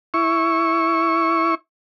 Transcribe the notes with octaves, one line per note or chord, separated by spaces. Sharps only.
E4 C#6